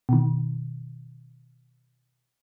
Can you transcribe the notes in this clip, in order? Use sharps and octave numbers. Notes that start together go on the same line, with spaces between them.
B2 D#3